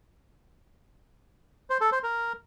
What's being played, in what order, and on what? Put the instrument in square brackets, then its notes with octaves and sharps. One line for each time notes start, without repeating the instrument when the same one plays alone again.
[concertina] C5
A4
C5
A#4